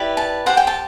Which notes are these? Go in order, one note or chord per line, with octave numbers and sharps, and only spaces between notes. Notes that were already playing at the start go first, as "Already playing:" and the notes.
Already playing: E4 G4 B4 D5
A5
G4 C5 F#5
G5
A5